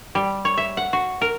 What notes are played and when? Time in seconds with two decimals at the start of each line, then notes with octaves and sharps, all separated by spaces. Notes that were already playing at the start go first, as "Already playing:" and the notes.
0.15 G3
0.45 C#5
0.57 E5
0.77 F#5
0.93 F#4
1.21 A#4